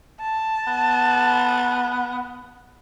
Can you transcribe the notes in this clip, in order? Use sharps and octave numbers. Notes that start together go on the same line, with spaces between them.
A5
B3